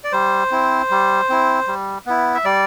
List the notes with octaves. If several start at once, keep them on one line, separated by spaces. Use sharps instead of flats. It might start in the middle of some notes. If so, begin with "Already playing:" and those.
D5
G3 C5
C4 E4
G3
C4 E4
G3
B3 E4
E5
G3 D5